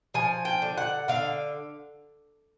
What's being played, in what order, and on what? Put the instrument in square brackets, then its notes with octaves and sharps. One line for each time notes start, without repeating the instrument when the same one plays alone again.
[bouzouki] F3 G#5
G5
D3
F#5
D3 F5